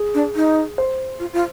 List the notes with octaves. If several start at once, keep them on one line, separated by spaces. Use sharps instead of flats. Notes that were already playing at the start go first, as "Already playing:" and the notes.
Already playing: G#4
D4
D#4
C5
F4
F4